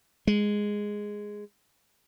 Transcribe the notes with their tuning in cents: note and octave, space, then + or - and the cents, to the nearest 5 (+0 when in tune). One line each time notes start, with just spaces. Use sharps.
G#3 -5